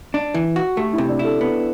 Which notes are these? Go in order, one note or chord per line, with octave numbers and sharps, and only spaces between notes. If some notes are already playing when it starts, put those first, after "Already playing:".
D4
E3
F#4
A3 G4
E4
C3
D4
E4 A4
B3